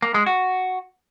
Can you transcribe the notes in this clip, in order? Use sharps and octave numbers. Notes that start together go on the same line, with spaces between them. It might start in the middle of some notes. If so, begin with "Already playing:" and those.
A#3
G#3
F#4